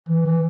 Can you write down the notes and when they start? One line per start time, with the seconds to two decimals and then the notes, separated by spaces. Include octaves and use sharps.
0.09 E3
0.25 E3